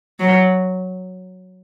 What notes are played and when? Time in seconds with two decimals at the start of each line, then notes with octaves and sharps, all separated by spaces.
0.19 F#3